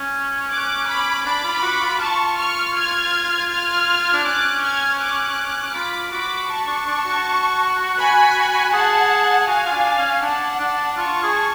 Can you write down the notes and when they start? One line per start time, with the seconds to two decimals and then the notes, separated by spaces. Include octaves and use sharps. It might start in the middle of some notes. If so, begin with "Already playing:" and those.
Already playing: C#4
0.50 D6 F#6
0.88 B5 D6
1.25 D4 B5 D6
1.44 F4
1.62 F#4
1.81 F4
2.00 F4 A5 C#6
2.38 C#6 F6
2.75 F6 G#6
3.50 F6 G#6
4.13 D4
4.24 C#4 D6 F#6
4.62 F6 G#6
4.98 D6 F#6
5.74 F4 B5 D6
6.11 F#4 B5 D6
6.48 A5 C#6
6.67 D4
6.87 D4
7.05 F#4
7.98 G#5 B5
8.73 G#4 F#5 A5
9.47 F#4 F5 G#5
9.66 F4
9.72 D4
9.98 C#4
10.22 D4 F#5 A5
10.60 D4
10.97 F4 A5 C#6
11.23 G#4